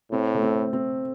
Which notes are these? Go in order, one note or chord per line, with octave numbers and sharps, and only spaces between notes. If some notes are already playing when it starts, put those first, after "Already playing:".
A2 C4
A3
C4
C4